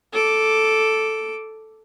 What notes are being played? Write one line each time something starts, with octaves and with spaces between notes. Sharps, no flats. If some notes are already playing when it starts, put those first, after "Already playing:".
A4 D6